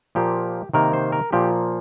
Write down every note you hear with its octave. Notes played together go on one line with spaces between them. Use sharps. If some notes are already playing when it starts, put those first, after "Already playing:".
A#2 F3 A#3 G4
C3 D#3 A#3 A#4
C5
A#4
A#2 F3 A#3 G4